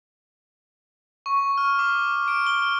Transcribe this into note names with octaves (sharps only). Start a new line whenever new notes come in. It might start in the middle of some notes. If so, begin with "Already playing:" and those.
C#6
F6
D6
D7
G7